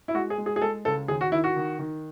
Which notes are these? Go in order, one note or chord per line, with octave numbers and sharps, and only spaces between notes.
E4
G#3 F#4
G#4
G#3
G#4
G#4
G#3 A4
C#2 A4
D#2 G#4
F#4
D#3 E4
F#4
D#3
D#3